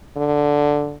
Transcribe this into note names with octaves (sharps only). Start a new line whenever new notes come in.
D3